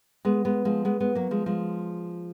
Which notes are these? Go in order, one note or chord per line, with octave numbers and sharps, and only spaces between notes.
G#3 B3
G#3 B3
F3 G#3
G#3 B3
G#3 B3
F#3 A#3
F3 G#3
F3 G#3